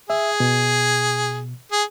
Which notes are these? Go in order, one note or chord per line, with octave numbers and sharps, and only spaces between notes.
G#4 E5
B2
G#4